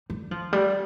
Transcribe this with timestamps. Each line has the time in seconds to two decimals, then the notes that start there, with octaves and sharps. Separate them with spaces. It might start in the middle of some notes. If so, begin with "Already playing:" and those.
0.10 G3
0.31 F3
0.53 G3